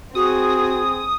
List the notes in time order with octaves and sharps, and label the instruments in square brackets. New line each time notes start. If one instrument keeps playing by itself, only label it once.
[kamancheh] C4 G#4 [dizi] F#4 [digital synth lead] D#6